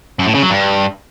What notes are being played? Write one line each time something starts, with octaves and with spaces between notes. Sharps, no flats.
F#2
A2
C#3
F#3
G2